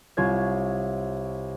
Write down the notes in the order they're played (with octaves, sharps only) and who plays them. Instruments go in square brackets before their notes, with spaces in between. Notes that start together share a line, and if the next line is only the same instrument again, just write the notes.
[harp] C2 F4 C#5 G#6